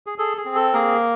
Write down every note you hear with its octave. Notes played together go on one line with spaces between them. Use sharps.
G#4
G#4 A4
G#4
C4
A4
A#3 G#4 A#4